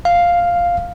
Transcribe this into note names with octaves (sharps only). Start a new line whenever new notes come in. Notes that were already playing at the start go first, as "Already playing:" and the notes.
F5